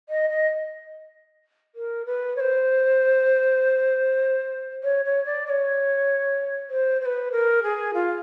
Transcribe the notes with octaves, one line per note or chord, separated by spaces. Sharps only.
D#5
D#5
A#4
B4
C#5
C5
C#5
C#5
D5
D5
C#5
C5
C5
B4
A#4
G#4
F4